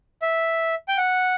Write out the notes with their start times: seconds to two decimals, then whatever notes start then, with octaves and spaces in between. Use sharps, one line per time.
0.22 E5
0.88 G5
0.97 F#5